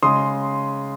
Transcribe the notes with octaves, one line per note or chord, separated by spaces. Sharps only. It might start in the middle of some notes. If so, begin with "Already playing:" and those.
C#3 G#3 C6 D#6